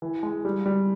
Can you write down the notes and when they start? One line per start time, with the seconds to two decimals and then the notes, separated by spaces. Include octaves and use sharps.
0.02 E3
0.23 G#3
0.45 G3
0.66 G3